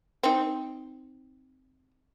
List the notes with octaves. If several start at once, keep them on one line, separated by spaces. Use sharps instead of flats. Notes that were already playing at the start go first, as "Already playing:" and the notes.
C4 D#4